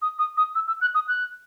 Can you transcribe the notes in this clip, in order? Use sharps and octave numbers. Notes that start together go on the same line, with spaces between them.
D#6
D#6
D#6
E6
E6
F#6
D#6
F#6